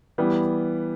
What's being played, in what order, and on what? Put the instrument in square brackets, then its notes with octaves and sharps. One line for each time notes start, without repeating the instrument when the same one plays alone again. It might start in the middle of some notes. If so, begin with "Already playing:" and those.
[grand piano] E3 G3 B3